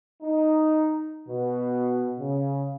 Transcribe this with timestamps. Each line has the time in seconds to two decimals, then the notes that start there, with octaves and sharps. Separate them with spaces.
0.23 D#4
1.28 B2
2.18 C#3